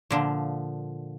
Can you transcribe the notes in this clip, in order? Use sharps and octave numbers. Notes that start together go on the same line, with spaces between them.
A#2 D3 F3